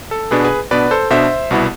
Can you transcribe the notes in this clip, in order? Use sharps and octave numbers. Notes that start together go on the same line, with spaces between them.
A4
B2 B3 D4 G#4 B4
G#4 B4
B2 B3 D4 B4 D5
A4 C5
B2 B3 D4 C5 E5
C2 B2 B3 E4